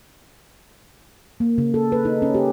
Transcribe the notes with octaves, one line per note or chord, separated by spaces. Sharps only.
A#3
C#3
A4
B4
D#4
C#4
G4